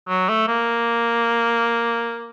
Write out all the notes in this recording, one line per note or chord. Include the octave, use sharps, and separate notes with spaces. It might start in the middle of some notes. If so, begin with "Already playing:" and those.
F#3
A3
A#3